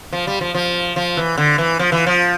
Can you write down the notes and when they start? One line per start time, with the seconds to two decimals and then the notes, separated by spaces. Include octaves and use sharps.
0.13 F3
0.27 G3
0.41 F3
0.54 F3
0.96 F3
1.17 E3
1.38 D3
1.58 E3
1.79 F3
1.92 E3
2.06 F3